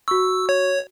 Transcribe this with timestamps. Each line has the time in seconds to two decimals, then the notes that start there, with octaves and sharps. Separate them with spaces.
0.08 F#4 C#6 E6
0.49 C#5